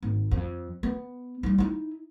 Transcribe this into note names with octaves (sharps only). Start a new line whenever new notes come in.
G#1
F2
B3
G3 D#4
D#4 E4